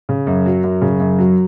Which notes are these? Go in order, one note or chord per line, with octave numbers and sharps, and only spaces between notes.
C#3
F#2
F#3
F#2
C#3
F#2
F#3